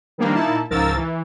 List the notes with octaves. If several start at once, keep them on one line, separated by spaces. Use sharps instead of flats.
D#3 F3 G3 A#3 D4
A#2 A#3 D#4 E4 A5
C#2 G#2 F3 A#4 E6 A6
E3